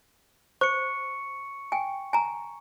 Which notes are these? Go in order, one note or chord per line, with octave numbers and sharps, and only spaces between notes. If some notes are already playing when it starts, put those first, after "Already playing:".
C5 C#6 C#7
G5 G#5
G#5 A#5